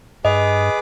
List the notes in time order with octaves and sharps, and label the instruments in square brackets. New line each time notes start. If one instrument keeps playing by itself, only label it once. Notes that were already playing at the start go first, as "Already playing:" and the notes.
[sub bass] G2 [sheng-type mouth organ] G#4 B4 D6 [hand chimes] D#5